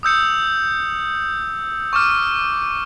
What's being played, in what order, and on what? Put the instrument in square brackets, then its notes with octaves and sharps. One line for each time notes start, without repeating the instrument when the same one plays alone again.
[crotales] D#6 E6 G6 C#7
C#6 D6 F6